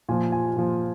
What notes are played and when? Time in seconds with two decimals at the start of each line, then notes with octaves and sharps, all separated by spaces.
0.09 A#2 F3 G#5
0.32 G#5
0.56 A#2 F3